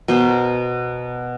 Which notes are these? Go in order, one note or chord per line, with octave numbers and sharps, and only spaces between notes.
B2 A#4 C5